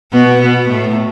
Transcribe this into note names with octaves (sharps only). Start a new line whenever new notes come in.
B2 B3
B2 B3
A2 A3